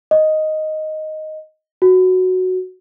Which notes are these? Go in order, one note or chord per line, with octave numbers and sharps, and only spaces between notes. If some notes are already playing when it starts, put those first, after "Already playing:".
D#5
F#4